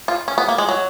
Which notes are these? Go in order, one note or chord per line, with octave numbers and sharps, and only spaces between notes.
F4
C#4
B3
A#3
G#3
F#3